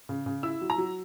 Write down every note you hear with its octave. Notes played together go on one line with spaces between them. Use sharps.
C#3
C#3
E4 E6
F#3
A#5
F#3